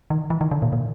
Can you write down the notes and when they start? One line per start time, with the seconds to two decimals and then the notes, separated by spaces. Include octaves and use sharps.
0.10 D#3
0.30 E3
0.41 D#3
0.51 D3
0.62 A#2
0.73 A#2